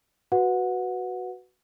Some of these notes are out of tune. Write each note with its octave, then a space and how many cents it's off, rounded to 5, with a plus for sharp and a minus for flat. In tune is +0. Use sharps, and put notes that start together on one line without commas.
F#4 +0 B4 +0 F#5 -20